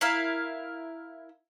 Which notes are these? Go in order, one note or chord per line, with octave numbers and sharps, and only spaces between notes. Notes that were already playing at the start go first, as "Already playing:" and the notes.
E4 A#4 F5